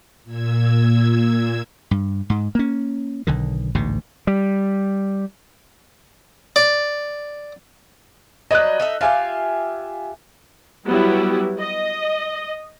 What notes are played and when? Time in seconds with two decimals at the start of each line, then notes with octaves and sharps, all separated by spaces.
0.24 A#2 E6 G#6
1.91 G2
2.30 G#2
2.55 A#3 C#4
3.27 B1 D3 D#3
3.75 A1 D2 G#2 B2
4.27 G3
6.56 D5
8.51 F#3 G3 B4 D#5 F#6
8.80 D#4 A4 E5
9.01 F4 G4 E5 F5 G#5
10.87 F#3 G3 B3 E4 F#4 G4
11.59 D#5